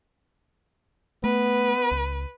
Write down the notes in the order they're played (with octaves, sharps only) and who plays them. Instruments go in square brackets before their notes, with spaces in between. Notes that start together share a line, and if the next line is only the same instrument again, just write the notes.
[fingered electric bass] A3 [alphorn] B3 [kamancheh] B4
[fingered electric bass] C#2